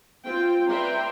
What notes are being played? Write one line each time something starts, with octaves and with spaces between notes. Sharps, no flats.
C4 F4 G5
B4 D5 E5 G5 A#5 C6